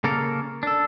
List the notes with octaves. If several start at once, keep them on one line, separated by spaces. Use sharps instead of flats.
C#3 A#3 A4 A#4
D4 A4